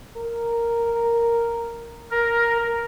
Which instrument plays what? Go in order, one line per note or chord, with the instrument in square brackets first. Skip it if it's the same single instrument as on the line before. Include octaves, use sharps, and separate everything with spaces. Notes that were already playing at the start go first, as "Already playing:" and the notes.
[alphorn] A#4
[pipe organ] A#4